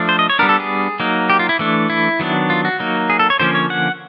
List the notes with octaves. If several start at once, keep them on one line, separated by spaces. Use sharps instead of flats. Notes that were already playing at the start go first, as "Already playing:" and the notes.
Already playing: F3 A3 D4
C5
D#5
C#5
G3 B3 D4 A#4
A4
G#4
F#3 A#3 D#4
G4
F4
E4
E3 A3 D4
E4
D#3 F#3 B3 D4
F4
F#4
F#3 A#3 D#4
G#4
A4
C#5
D3 F3 A#3 C#4 C5
C#5
F#5